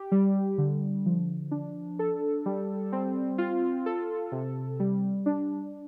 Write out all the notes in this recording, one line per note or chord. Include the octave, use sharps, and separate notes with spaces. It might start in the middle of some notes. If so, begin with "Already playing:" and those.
Already playing: G4
G3
D3
F3
D4
A4
G3
C4
F4
A4
C3
G3
D4